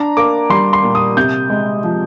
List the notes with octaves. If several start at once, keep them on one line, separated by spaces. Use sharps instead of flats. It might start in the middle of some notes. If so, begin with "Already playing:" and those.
Already playing: D4 A#5
A#3 D6
G3 C6
C6
A#2
D#6
C3 G6
G#3
F3